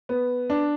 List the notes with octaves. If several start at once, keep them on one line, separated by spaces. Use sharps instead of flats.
B3
D4